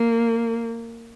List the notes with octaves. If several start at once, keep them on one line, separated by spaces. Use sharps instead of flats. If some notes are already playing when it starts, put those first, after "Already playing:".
Already playing: A#3